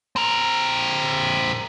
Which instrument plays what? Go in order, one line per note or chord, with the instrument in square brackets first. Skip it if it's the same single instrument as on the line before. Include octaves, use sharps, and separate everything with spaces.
[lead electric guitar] C4 A#4